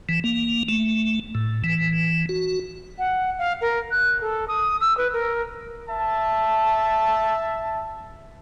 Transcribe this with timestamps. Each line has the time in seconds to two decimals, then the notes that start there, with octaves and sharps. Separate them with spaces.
0.09 E3
0.24 A#3
0.68 A3
1.35 A2
1.64 E3
2.29 F#4
2.99 F#5
3.39 F5
3.61 A#4
3.91 F#6
4.21 A4
4.48 D#6
4.81 E6
4.98 B4
5.13 A#4
5.90 E5 A5